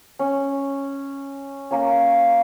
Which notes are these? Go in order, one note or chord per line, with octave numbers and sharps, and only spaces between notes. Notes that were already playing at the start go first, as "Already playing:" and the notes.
C#4
A#3 C#4